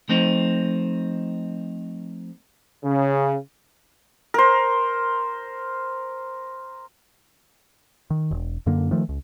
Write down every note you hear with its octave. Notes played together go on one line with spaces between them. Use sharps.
F3 A3 C4 D#4
C#3
A#4 C5
D#3
E1
F#2 D3 A#3
D#3 F3 A3
C#2